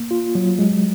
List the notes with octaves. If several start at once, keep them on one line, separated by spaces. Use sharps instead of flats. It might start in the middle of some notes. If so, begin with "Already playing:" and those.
Already playing: A#3
F4
F#3
G#3